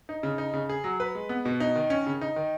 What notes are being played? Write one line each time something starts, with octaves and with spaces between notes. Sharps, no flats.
D#4
C#3
D#4
C#3
G#4
F#3
B4
G#3
B3
B2
D#4
D#3
C#4
C#3
D#4
D#3